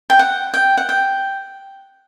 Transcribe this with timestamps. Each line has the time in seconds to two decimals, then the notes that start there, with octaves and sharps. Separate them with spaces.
0.10 G5
0.19 F#5
0.54 G5
0.77 F#5
0.89 G5